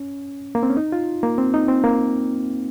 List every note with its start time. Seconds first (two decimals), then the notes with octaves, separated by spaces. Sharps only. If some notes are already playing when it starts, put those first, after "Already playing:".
Already playing: C#4
0.55 A#3
0.63 C4
0.70 C#4
0.77 D#4
0.92 F4
1.23 A#3
1.38 C4
1.54 D#4
1.68 C4
1.84 A#3